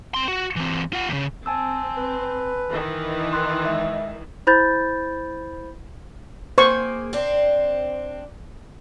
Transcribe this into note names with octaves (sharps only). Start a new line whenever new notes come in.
C4 C6
F#4
E3 C4
F4 F#5
D#2 C#3
C4 G#5 A5 E6
B4
D#3 E3
C6 F#6
G#3 E5
E4 C5 B5 G6 A6
A#3 G#4 C5 C#6
C4 D4